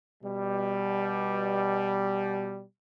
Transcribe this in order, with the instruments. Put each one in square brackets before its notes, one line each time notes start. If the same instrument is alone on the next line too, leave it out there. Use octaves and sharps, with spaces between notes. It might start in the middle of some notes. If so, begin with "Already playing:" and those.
[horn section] B2 G3